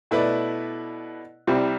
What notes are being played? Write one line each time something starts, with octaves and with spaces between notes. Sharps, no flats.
B2 A3 E4 B4 D5
C2 C3 G3 C4 E4